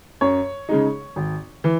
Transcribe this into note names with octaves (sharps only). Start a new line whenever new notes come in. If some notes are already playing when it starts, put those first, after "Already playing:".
F#2 C#5
C#3 G#3 D#4
G#1
E3